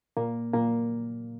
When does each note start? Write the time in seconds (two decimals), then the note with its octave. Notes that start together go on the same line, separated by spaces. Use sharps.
0.17 A#2 A#3
0.53 A#2 A#3